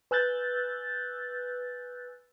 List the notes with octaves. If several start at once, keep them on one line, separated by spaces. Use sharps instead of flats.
B4 G#5 E6 F#6 G6 A6